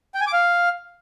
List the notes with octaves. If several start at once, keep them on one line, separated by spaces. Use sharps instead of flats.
G5
G#5
D6
F5